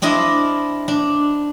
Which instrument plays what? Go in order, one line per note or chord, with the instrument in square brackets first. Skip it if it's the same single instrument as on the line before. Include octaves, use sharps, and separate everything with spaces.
[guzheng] C4 D4 E4 D#5 F5
D4